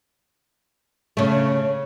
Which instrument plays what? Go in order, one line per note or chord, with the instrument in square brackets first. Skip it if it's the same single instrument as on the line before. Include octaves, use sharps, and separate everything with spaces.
[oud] C#3 A3